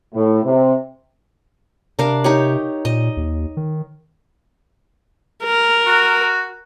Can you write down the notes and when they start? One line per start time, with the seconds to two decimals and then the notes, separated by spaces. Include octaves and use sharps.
0.14 A2
0.44 C3
1.99 C3 D4 A#4 F5
2.24 D#4 G4 C#5
2.85 A#2 D#5
3.17 D#2
3.57 D#3
5.44 A#4
5.86 F#4